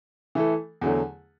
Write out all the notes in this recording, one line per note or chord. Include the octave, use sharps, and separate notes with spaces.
E3 A3 E4 A4
E2 D3 F#3 A3